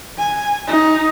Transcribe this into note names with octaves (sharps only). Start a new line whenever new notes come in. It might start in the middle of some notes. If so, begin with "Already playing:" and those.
G#5
D#4